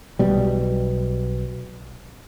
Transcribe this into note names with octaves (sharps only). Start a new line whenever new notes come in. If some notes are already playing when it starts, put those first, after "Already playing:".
B1 B2 G3